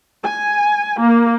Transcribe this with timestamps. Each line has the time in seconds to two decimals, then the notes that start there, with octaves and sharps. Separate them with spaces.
0.23 G#5
1.00 A#3